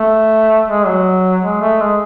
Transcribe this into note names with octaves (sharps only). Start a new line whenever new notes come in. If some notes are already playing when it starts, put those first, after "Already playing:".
Already playing: A3
G#3
F#3
G#3
A3
G#3